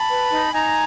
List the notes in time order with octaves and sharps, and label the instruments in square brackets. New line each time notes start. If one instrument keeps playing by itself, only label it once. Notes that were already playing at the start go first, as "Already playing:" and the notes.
Already playing: [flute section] A5 B5
B4
D#4
D#4 G#5 A#5